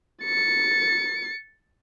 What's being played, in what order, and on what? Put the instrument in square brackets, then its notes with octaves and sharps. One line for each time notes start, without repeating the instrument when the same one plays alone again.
[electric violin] A6 C#7